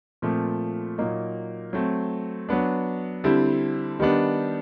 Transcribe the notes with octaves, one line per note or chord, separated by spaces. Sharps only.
A#2 F3 A3 C4
A#2 F#3 A#3 D#4
F#3 A3 C4
F#3 B3 D4
D3 G3 C4 E4
D#3 G3 B3 D4